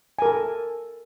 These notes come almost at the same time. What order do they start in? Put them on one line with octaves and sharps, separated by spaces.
G#5 A#4 A4